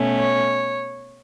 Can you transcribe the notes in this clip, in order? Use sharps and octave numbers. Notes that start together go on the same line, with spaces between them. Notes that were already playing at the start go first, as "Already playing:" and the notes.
Already playing: B2 A3 C#4
C#5